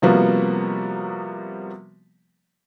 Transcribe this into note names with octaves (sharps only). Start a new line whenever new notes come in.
C3 F3 G3 A#3 B3 F#4